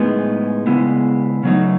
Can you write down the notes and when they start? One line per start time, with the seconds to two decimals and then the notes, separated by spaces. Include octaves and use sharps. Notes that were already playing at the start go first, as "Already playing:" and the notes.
Already playing: A2 G#3 B3 D#4
0.67 C#3 G#3 B3 E4
1.43 C#3 F#3 A3 D#4